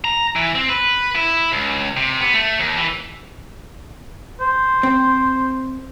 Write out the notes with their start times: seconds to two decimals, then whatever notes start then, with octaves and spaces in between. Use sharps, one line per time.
0.05 A#5
0.36 E3
0.55 C4
0.69 B4
1.15 E4
1.52 C#2
1.97 C3
2.20 B3
2.34 A3
2.60 D#2
2.77 E3
4.40 C5
4.83 C4